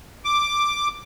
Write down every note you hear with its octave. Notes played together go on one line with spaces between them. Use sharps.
D6